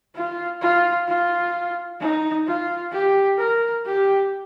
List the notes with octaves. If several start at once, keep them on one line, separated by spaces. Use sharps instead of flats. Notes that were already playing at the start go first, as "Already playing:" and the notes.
F4
F4
F4
D#4
F4
G4
A#4
G4